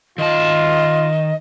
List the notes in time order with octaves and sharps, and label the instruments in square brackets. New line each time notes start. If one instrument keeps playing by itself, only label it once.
[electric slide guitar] D#3 A5 [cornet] F4 [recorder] D#5